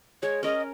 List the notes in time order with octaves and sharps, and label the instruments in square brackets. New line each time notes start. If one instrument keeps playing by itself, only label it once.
[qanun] G#3 [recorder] C#5
[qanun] C#4 A#4 [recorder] D#5